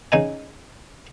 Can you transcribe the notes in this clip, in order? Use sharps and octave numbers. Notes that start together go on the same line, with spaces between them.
C#3 D#4 D#5 G#5